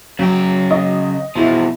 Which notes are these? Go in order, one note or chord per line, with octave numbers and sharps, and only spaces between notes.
C#3 F#3 G5
D#5
E2 B2 F3 E4